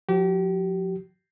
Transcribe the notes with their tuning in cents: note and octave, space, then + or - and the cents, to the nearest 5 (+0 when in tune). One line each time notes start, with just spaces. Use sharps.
F3 +35 G4 -35